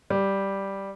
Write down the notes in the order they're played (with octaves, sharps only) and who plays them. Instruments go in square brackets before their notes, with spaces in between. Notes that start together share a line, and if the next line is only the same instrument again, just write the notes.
[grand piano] G3